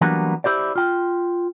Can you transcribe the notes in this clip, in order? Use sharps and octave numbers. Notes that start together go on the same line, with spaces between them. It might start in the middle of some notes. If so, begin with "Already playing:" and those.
E3 F#3 G3 A#3 B3 D4
E4 G4 C5 D5
F4 G5